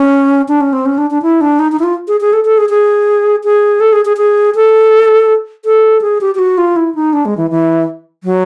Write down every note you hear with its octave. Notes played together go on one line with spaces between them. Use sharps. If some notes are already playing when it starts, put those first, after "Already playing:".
Already playing: C#4
D4
C#4
C4
C#4
D4
D4
E4
D4
D#4
D#4
E4
F4
G#4
G#4
A4
A4
G#4
G#4
G#4
A4
G#4
G#4
G#4
A4
A4
G#4
G4
G4
F#4
F4
E4
D#4
D4
G#3
E3
E3
F#3